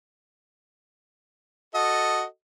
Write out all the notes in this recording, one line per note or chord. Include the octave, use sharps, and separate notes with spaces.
F#4 A4 D#5